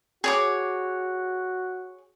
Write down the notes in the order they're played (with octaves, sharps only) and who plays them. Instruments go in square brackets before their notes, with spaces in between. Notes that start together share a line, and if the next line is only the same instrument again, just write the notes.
[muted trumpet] F#4 [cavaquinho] G#4 C#5 D6